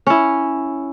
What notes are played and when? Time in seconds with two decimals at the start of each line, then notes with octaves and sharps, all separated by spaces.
0.07 C#4 E4